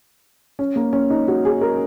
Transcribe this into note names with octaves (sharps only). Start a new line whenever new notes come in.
C#4
A#3
C#4
D#4
F#4
G#4
A#4